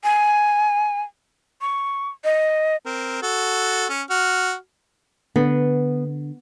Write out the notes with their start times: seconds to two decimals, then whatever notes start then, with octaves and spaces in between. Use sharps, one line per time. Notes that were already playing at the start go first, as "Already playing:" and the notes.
0.04 G#5
1.61 C#6
2.24 D#5
2.86 C4 A#4
3.22 F#4 A4
3.89 C#4
4.10 F#4 F6
5.36 D3 B3